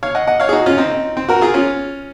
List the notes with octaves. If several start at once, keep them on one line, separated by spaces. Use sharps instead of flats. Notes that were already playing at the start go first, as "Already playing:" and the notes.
C#5 F5
D#5 F#5
D#5 F#5
C#5 F5
G#4
D#4 F#4
C#4 F4
C4 D#4
C4
F#4 A#4
F4 G#4
C#4 F4